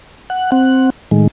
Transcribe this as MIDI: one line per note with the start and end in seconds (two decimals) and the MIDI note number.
0.30 0.51 78
0.52 0.90 60
0.52 0.90 78
1.11 1.27 45
1.11 1.27 51
1.11 1.27 56